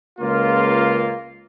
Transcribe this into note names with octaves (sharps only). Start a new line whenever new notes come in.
C#2 A#3 F4